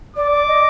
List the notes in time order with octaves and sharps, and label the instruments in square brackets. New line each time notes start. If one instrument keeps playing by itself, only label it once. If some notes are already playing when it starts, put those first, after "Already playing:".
[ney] D5 [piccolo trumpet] D6
[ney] D5
D#5